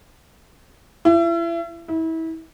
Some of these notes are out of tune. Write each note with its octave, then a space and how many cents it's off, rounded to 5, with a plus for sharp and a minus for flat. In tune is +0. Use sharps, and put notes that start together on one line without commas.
E4 +35
E4 -30